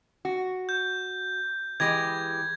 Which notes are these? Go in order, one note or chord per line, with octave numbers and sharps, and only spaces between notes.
F#4
G6
E3 G#3 G4 G#6 A#6